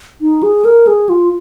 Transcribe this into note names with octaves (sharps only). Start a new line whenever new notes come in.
D#4
G#4
A#4
G#4
F4